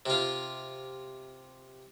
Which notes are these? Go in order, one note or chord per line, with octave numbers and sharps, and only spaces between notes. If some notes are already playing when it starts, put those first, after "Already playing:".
C3 F4